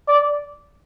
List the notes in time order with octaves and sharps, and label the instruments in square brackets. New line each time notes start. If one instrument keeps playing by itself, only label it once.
[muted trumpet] D5